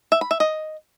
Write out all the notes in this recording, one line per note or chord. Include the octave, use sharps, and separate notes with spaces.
E5
B5
E5
D#5